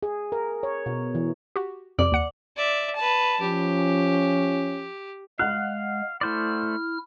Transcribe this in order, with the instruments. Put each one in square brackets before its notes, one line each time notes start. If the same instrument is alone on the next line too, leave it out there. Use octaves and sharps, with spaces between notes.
[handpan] G#4
A#4
C#5
B2
E3
[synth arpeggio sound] F#4 G4
[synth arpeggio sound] F2 C3 [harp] D5
[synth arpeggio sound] D#2 F#5 C#7
[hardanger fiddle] D5 E5
B4 A5
[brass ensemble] F3 C#4 [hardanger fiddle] G4
[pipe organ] G#3 [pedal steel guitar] F5 [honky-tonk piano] F#5 F#6
[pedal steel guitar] A3 C5 D5 [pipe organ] E4 F6